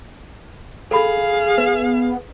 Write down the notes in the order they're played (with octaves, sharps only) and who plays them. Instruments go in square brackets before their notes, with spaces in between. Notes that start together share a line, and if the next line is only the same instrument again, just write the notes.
[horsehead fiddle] G#4 [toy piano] A4 B5 [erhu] F5
[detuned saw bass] B3 [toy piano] B4